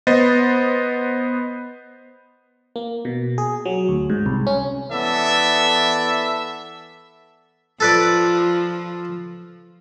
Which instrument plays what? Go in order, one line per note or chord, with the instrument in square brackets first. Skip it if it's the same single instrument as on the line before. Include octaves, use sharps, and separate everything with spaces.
[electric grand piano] B3 C5 D#5 A6
[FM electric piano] A#3
B2
G#4
F#3
D2
G#2
C2
C#4
[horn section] E3 B3 A4 D5 E5
[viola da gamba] F3 [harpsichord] A4 B4 D5